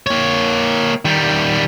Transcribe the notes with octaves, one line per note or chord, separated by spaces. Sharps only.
A#3 C#5
D#3 G3